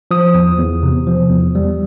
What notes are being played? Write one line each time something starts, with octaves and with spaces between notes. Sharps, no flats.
F3 D#6
E2
E2
C3
F3
E2
G3